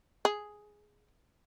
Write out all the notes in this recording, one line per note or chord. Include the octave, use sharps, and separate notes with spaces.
G#4